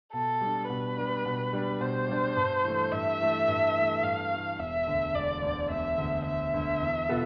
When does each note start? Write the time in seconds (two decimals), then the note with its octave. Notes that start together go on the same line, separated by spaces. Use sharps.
0.13 B2 A4
0.41 G3 D4
0.69 B2 B4
0.97 G3 D4
1.25 B2
1.53 G3 D4
1.80 B2 C5
2.08 G3 D4
2.36 G2
2.64 E3 A3
2.92 G2 E5
3.20 E3 A3
3.48 G2
3.76 E3 A3
4.03 G2 F5
4.30 E3 A3
4.59 E1 E5
4.87 D2 D3
5.15 E1 D5
5.42 D2 D3
5.70 E1 E5
5.98 D2 D3
6.26 E1 E5
6.54 D2 D3
6.81 E2
7.09 B2 B3 F4 A4